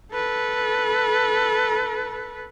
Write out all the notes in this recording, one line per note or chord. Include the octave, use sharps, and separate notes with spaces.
A4 B4